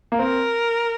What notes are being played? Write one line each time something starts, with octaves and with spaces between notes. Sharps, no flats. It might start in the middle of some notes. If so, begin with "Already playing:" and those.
A#3
C4 A#4